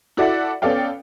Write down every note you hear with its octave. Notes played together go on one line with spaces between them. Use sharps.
E4 F#4 A4 D5 E5 F#5
B3 C#4 A4 D5 F5 G5